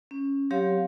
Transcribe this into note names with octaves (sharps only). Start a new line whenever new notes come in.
C#4
F#3 C4 G4 C#5 F5